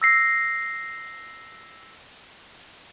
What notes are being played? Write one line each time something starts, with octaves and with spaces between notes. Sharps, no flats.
E6 A#6 C7